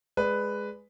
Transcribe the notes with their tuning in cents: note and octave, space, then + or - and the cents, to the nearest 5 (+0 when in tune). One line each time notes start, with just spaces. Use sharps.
G#3 +0 B4 +5 D5 +0